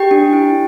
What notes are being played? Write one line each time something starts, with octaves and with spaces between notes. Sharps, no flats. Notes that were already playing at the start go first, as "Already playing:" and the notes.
Already playing: G4 G5
D4
E4